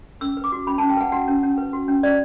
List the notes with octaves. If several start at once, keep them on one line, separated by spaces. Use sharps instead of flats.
C#4 E6
B4
D6
F#4
C#4 B5
C#4 A5
G5
B4 F#5
F#4 F#5
C#4
C#4
B4
F#4
C#4
C#4 D5